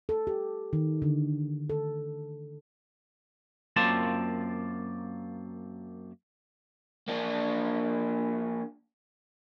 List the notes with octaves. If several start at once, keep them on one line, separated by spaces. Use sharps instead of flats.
A4
G4
D#3
D3
A4
F#2 A#3 C4 F4 D5 A5
A#3 D4